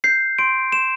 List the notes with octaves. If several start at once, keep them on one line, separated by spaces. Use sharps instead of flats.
G6 C7
C6 D7
C6 E7